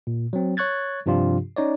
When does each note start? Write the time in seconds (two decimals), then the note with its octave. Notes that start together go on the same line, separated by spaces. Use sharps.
0.07 A#2
0.33 F#3 C4
0.57 C#5 C#6 F#6 G#6 A6
1.06 G2 C3 F3 D4 F4 G4
1.56 C#4 D#4 C#5 D5